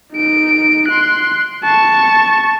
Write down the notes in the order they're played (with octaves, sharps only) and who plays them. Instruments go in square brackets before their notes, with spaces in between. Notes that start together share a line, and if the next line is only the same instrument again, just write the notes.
[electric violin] D#4 D7
C6 F#6
A5 C#6